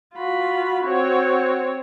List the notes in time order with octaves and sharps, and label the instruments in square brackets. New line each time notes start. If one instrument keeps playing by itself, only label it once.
[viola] F4 B5 [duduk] F#4
[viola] C4 C#5